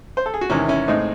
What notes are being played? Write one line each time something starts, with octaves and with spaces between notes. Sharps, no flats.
C5
A4
G#4
F#4
E2 C3 D#3 C#4 E4
C#4 E4
A2 G#3 C4 D#4